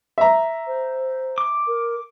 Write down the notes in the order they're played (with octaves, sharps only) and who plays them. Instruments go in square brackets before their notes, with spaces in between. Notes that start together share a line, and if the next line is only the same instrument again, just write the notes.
[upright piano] E5 A#5
[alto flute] C5
[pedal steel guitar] D6
[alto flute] A#4